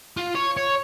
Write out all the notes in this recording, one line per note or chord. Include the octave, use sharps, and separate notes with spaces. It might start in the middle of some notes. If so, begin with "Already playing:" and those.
F4
C#5
C#5